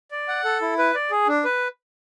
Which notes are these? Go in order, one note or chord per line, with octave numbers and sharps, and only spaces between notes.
D5
F#5
A4
E4
B4
D5
G#4
D4
B4